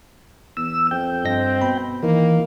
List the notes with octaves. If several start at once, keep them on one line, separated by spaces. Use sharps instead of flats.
E2 E6
F2 G5
G2 C4 D#5 A#6
B2 B5
D#3 E3 A#3